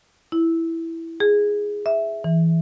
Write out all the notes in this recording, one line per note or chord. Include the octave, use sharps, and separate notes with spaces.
E4
G#4
E5
E3